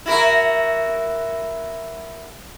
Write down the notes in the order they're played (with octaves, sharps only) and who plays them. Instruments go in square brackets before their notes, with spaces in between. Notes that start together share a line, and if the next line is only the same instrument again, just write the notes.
[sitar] E4 F#4 A#4